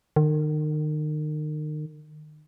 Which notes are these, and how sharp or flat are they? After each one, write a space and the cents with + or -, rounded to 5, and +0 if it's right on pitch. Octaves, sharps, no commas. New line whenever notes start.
D#3 -35